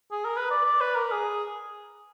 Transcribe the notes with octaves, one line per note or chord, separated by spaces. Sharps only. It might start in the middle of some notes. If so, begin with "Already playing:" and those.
G#4
A#4
B4
D5
D5
B4
A#4
G#4